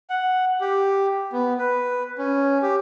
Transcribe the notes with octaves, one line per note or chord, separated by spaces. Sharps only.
F#5
G4
B3
B4
C#4
G4